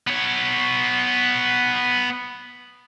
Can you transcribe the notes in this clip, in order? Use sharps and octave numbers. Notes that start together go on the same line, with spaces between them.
B3 C#5